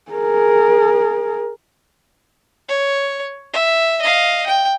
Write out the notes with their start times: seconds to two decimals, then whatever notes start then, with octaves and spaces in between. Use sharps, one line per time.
0.12 G#4 A#4
2.69 C#5
3.54 E5
4.02 D#5 F5
4.47 G5